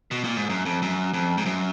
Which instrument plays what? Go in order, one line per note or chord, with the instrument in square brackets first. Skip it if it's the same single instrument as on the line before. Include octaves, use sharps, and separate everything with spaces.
[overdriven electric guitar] B2
A#2
G#2
F#2
F2
F#2
F2
G#2
F#2